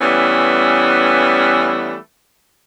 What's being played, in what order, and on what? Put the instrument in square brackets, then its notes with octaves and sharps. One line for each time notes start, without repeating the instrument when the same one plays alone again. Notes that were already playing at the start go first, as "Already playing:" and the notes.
[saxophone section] E3 G3 A3 B3 C#4